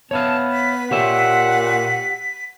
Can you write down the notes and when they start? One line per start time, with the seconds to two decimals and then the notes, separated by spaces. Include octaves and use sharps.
0.11 B3 C#5 E5 F5 A5
0.52 B6
0.91 A#2 G4 C#5 E5 F#5